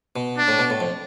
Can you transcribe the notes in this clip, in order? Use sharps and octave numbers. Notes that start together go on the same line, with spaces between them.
B2
D4
A2
B2
A2
F2